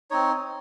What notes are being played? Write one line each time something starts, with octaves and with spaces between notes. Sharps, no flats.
C4 D#4 C#5